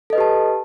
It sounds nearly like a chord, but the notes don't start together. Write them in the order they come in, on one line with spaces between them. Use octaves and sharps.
A4 D#5 B4 G4 A5